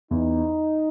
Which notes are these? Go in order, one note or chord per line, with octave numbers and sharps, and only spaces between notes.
E2 D#4